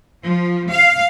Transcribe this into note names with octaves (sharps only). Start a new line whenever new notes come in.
F3
F5